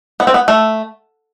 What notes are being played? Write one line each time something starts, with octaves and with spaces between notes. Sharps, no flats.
B3
C4
B3
A3